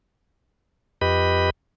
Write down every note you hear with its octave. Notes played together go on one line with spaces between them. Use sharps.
F2 G4 B4 D#5 B5